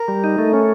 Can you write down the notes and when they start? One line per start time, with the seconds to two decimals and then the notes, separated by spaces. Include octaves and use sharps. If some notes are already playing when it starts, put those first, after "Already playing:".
Already playing: A#4
0.08 G3
0.24 D#4
0.38 A3
0.53 C#4